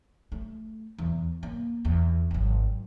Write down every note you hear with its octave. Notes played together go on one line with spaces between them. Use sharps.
A3
E2
A#3
E2
G#1 F#3